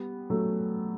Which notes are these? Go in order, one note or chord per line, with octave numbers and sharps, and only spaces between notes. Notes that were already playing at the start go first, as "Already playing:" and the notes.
Already playing: G3 B3
F#3 A3